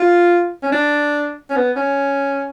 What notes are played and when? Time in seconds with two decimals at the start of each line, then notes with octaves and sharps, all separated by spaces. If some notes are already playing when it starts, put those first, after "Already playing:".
Already playing: F4
0.63 C#4
0.72 D4
1.50 C#4
1.56 B3
1.76 C#4